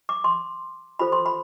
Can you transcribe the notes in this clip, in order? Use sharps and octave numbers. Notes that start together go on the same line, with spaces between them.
D6
C6
F4 A4 C5 B5
C6
B5